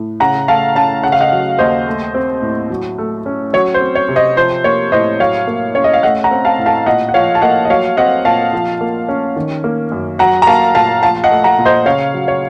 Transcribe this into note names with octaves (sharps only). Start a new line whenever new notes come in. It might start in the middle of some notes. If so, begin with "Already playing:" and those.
Already playing: A2
C#3 F#5 A#5
A3 F5 A5
C#4 F5 A5
C#3 F#5
F5
D#5 F#5
F#3
D#2 C5 D#5
A3
C4
A2
F#3
A3
C#4
F#3 C#5
C5
C4
C#5
C3
C5 D#5
F3 C5
A#3 C#5
A2 C5 D#5
F#3 C#5 F5
A#3
C#4 C#5
D#5
F5
A3 D#5 F#5
F#5 A#5
C4
F5 A5
A2
F5 A5
A#2 D#5 F#5
F#5
F3 C#5 F5
A5
A#3 D#5 F#5
D#5
F#3 C#5 F5
C4 D#5 F#5
A#2 F5 A5
F3
A#3
C#4
D#3
A#3
F#2
F#3 F#5 A#5
A#5
A#3 F5 A5
A#2 F5 A5
F3 F5 A5
D#5 F#5
A3
F#5 A#5
A#2
C5 D#5
C#3 C#5 F5
F#3
C#5